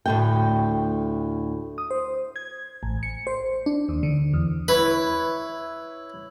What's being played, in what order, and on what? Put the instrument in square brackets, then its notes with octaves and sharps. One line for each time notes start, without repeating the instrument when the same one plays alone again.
[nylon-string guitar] D2 A2 G5
[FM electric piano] D#6
C5
G#6
A1
C#7
C5
D4
D#2
D3
E2
[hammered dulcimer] E4 C#5 [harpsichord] B4